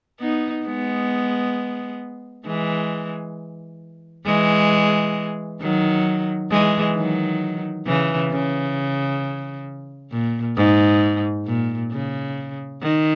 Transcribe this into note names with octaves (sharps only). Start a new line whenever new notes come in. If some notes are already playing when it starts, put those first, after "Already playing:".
B3 D#4
G#3 B3
E3 G#3
E3 G#3
D#3 F#3
E3 G#3
D#3 F#3
C#3 E3
C#3
A#2
G#2
A#2
C#3
D#3